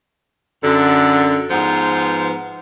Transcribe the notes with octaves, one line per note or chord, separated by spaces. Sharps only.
F#2 D3
G#2 F3 B3